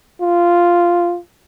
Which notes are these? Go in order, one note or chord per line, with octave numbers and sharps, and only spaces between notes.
F4